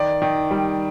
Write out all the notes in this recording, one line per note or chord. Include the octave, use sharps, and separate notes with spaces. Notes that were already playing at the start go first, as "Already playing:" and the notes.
Already playing: D#3 D5
D#3
G3